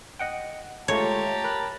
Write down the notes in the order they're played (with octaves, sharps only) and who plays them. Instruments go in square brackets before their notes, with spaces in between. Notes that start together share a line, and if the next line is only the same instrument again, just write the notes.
[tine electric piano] D#5 F#5 G5
[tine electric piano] G#3 A3 F4 [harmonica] G4 A5 A#5 [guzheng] C#5
[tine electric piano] A#4 B5 F#6